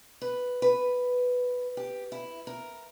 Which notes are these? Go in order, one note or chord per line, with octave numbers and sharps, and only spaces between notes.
B4
B4
G4
E4
A#4